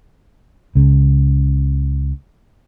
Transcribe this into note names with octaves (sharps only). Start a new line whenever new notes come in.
C#2 C#3